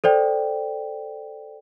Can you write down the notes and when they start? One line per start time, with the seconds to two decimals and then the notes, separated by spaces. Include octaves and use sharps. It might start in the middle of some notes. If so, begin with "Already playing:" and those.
0.04 A4 C5 D5 G5